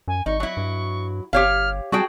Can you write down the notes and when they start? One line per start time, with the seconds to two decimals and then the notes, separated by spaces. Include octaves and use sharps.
0.08 F#2 G#5
0.26 G#1 D#4 C#6
0.40 F#3 E4
0.57 G2
1.33 G1 G4 C#5 F5 F6
1.92 G3 F#4 G#4 G5 A5